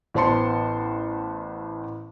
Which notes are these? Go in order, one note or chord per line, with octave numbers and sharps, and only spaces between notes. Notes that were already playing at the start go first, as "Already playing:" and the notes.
A1 B3 C5 A5 C6 C#7